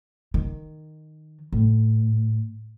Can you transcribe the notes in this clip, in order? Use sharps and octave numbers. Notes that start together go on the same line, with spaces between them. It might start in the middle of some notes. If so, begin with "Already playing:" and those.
D#3
A2